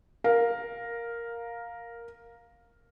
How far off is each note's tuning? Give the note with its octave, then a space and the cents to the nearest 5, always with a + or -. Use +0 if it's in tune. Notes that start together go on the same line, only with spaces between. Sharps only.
A#4 +0 F5 +10